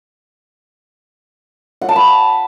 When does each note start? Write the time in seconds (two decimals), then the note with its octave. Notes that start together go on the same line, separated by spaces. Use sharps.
1.81 F#5
1.89 A5
1.96 B5